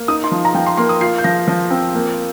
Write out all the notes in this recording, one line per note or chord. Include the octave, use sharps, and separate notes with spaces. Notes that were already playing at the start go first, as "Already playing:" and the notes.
Already playing: A#3
D#4 D#6
C6
F3
A#5
F3 G5
C6
A#3 C6
D#6
F4 C7
G6
F3 A#6
F3
C4
A#3